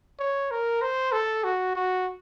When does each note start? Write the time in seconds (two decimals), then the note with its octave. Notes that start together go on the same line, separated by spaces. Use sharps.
0.20 C#5
0.51 A#4
0.82 C5
1.13 A4
1.44 F#4
1.76 F#4